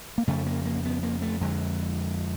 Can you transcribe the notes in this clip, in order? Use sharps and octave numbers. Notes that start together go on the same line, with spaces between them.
A#3
F2 C#3 A3
A#3
A#3
B3
A#3
A3
F2 D3 G#3